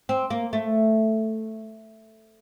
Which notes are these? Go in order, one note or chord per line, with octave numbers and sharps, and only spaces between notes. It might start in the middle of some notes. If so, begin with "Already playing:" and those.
C4
A#3
A3